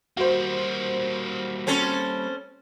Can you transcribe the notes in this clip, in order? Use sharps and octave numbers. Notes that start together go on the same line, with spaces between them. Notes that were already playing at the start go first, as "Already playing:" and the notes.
G3 A#3 F#4 C5
C4 C#4 A4